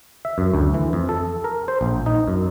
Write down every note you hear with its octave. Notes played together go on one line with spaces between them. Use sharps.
E5
F#2
D2
E3
F2
A4
A#4
C5
A#1
D#4
F#2